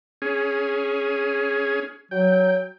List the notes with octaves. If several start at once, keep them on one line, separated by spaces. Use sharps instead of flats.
C#4 G#4
F#3 G5